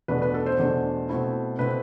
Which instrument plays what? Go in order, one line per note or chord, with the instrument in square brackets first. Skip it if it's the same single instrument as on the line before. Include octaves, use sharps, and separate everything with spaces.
[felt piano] E2 B2 A3 D4 B4
B4
A4
C5
E2 B2 A3 D4
B2 A3 C4 E4
B2 A3 C4 E4 B4